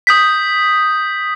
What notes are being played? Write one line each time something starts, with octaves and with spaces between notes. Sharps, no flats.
D#6 G6 B6